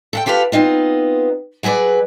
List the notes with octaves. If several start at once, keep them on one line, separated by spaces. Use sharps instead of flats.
A4 F#5 G5
F4 G4 A4 B4 F5
B3 C4 D#4 F4
F#3 G#4 B4 C5 D5